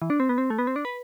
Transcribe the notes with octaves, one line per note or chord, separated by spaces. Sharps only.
E3
D4
C4
B3
C4
A3
B3
C4
D4
B4